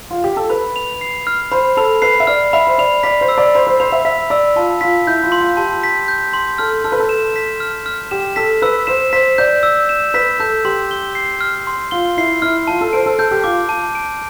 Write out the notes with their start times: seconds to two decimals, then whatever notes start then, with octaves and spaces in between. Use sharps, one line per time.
0.11 F4
0.24 G4
0.37 A4
0.50 B4 B5
0.76 F7
1.01 C7
1.27 F6
1.52 C5 B5
1.77 A4 F7
2.02 B4 C7
2.20 E5
2.27 D5 F6
2.53 E5 B5
2.67 C5
2.78 D5 F7
3.03 D5 B6
3.21 C5
3.29 E6
3.38 D5
3.54 C5 B5
3.67 C5
3.80 C5 F7
3.92 E5
4.05 E5 B6
4.30 D5 E6
4.56 F4 A5
4.81 F4 B6
5.07 E4 G6
5.23 F4
5.32 C6
5.41 F4
5.57 G4 A5
5.83 B6
6.08 G6
6.33 C6
6.58 A4 F6
6.84 A4 F6
6.92 B4
7.00 A4
7.09 E7
7.36 B6
7.60 F6
7.86 F6
8.11 G4 E7
8.36 A4 B6
8.62 B4 E6
8.87 C5 E7
9.13 C5 B6
9.38 D5 G6
9.63 E6
9.89 E7
10.14 B4 B6
10.40 A4 G6
10.65 G4 C6
10.91 G7
11.15 C7
11.41 F6
11.67 C6
11.91 F4 G7
12.17 E4 C7
12.42 E4 F6
12.67 F4 A5
12.81 A4
12.93 C5 D7
13.06 A4
13.19 A4 G6
13.31 G4
13.44 F4 D6
13.69 A5
13.95 D7